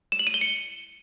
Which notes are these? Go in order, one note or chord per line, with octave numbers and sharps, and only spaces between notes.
E7
F#7
D#7
G7
C#7